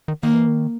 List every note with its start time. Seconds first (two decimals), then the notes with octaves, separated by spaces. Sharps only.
0.08 D#3
0.23 D#3 A#3
0.34 E3
0.47 D#3